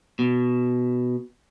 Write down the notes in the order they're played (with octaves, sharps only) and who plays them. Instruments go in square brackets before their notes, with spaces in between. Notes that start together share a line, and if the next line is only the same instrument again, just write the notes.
[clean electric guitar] B2